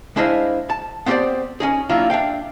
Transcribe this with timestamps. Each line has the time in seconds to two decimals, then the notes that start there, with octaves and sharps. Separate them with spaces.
0.16 G#3 D4 E4 C5 D#5 F5
0.70 A5
1.06 B3 C4 G4 B4 C5 D5
1.60 C#4 D#4 G#4
1.89 F#3 A#3 D4 E4 F4
2.10 D4 E5 F5 G5